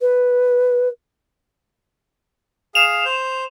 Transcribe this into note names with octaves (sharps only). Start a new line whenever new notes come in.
B4
G#4 F5 E7 F7
C5 G6